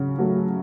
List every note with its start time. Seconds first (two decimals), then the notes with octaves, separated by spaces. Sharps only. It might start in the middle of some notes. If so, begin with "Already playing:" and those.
Already playing: C#3 F#3
0.18 F#3 A3